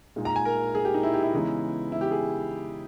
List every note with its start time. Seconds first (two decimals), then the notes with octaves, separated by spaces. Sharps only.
0.16 A#2 G#3 D#4
0.25 A#5
0.36 G#5
0.45 A#4
0.75 G#4
0.85 G4
0.94 D#4
1.03 E4
1.14 G4
1.23 E4
1.33 C#3 E3 G#3 B3 D#4
1.92 E4
2.01 G4
2.11 G#4